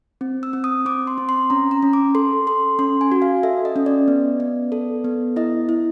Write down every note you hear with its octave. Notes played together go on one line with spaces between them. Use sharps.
C4
E6
C4
D#6
C4 D6
C6
C4
C6
C#4 A#5
A#5
C#4
D6
A4 C6
A4 C6
C#4 C6
G#5
F#4
F5
A4 E5
D#5
C#4
D5
B3
B3
A4
B3
E4 D#5
E4